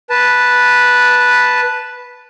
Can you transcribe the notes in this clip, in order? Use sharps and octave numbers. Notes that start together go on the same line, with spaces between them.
B4 A5